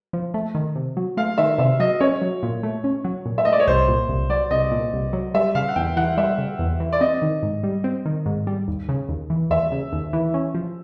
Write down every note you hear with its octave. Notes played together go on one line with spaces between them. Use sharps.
F3
A3
D#3
C3
F#3
A3 F5
D#3 E5
C3 E5
F#3 D#5
C#4 C#5
F#3
A#2
A3
C#4
F#3
A#2
E5
A3 D#5
D5
C#5
C2 C5
A#2
C2
F#3 D5
C2 D#5
A#2
C2
F#3
G3 E5
C#3 F5
F#5
E2 G5
E3 F#5
G3 E5
C#3
E2
E3
D5
C4 D#5
D#3
G#2
G3
C4
D#3
G#2
G3
D#2
C#3
D#2
E3
D#2 E5
C#3
D#2
E3
C#4
F3